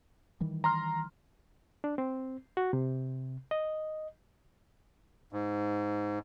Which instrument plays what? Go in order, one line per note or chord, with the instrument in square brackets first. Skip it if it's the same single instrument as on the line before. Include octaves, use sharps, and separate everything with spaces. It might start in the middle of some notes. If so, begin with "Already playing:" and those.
[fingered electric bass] D#3 E3 G3
[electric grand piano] A#5 C6 F6
[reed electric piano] D4
C4
F#4
C3
D#5
[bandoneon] G#2